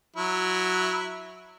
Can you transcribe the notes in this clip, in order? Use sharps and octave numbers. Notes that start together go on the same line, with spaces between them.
F#3 E4